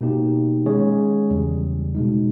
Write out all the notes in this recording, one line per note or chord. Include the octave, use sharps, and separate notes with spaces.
B2 A#3 D#4 G4
D#3 G#3 C#4 G#4 C#5
E2 C#3 G3
B2 G#3 D#4